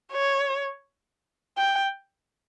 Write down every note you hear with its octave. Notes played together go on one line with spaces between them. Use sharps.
C#5
G5